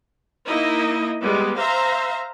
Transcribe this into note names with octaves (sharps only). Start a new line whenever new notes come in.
A#3 D#4 E4 D#5
G3 G#3 B3
C5 E5 F5 A#5